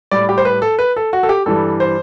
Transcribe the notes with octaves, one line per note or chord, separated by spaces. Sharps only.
A2 G3 D5
G4
C5
B4
A4
B4
A4
F#4
A4
G4
G2 E3 G3 A4
C5